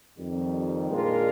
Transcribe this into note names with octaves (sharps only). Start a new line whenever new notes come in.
F2 D#3 G3
A#2 G#3 D4 F4 A#4